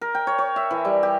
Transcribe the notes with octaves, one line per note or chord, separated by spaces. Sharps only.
A#4
G5
C#5
C#5
E5
E3
G3
G4